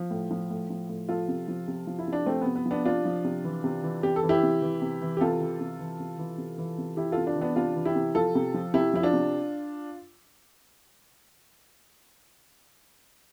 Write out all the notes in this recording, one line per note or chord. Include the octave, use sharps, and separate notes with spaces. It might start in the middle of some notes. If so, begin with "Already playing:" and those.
Already playing: F3
A2
F3
A2
F3
A2
F3 F4 A4
C3
F3
C3
F3
E4
C3
D4
F3 A3 C4
C3 B3
B3
F3
B3 D4
C3 D4 F4
F3
C3
E3
C3
E3
C3 G4
A4
E3
E4 G4
C3
E3
C3
E3
G4
C3 F4 A4
E3
C3
E3
C3
E3
C3
E3
C3
E3 E4 G4
C3 F4 A4
D4 F4
E3
B3 D4
C3 D4 F4
E3
E4 G4
C3
F3 F4 A4
C3
F3
C3 E4 G4
F3 E4
D4 F4
C3